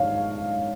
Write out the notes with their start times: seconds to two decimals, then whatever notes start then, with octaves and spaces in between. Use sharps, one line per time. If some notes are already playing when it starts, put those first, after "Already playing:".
Already playing: G#2 C#5 F5